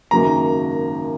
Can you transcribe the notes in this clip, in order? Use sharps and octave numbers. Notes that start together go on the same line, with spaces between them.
G#1 F#2 C#3 F#3 A#3 A#5